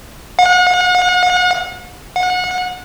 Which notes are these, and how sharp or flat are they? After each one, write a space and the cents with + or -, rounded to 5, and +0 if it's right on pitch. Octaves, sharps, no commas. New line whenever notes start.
F#5 -40
F#5 -30